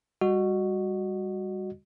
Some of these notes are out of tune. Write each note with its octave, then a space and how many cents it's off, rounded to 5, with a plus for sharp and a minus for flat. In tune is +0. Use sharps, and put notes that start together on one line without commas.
G3 +25 F#4 +0 D#5 -25